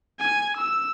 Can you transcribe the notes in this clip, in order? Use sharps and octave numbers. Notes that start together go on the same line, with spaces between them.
G#5
E6